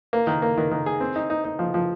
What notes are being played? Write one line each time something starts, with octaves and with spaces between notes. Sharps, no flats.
A#3
D#3
A#3
D#3
D#3
G#4
C4
D#4
D#4
D#4
F3
F3